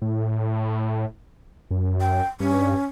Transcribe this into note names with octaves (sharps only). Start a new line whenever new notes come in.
A2
F#2
G5
G2 C#4